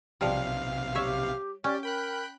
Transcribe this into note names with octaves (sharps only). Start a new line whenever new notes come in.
B1 C3 F3 G3 F5
G4 C#5 E5
C#4 G4 D5
A#4 G5 B5 F#6